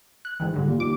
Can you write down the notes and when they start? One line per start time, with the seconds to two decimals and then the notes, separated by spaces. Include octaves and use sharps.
0.25 F#6
0.40 G#2 D#3 E3
0.54 G#2 D3 G3
0.67 A#2
0.80 D#2 D6